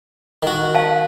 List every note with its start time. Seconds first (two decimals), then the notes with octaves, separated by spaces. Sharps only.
0.43 D#3 F#4
0.75 F5 A5